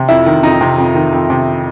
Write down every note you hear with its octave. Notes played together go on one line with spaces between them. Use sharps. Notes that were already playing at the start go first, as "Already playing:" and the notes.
Already playing: C3
F2 E4
D#3
F2 D#4
C3
F2
D#3
F2
C3